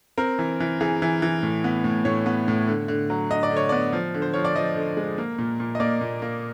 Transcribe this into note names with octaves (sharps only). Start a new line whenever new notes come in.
C4 A#4
E3
E3
E3 G#4
E3
E3
A2
B3
A2
A2 C#5
B3
A2
D3
D3
F#3
D3 D#5
D5
D3
C#5
B3 D5
F3
D3
C5
F3 C#5
D5
F3 D#5
D3
G#3
A#3
A#2
A#2
D#5
A#3 D5
A#2
A#3